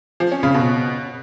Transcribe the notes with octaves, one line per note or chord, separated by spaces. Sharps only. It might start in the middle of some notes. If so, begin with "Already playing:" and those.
F3
C#4
C#3
B2